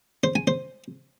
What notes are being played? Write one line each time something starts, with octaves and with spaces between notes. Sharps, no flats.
C5
G#5
C5